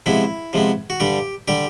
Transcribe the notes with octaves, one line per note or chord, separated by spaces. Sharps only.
C3 F3 G#3 B3 E4
C3 F3 G#3 B3
F#4
G2 D3 G3 G4
D3 G3 G4